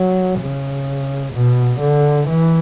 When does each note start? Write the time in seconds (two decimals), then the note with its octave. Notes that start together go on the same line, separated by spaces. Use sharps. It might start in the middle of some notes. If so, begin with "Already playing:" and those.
Already playing: F#3
0.40 C#3
1.33 B2
1.80 D3
2.27 E3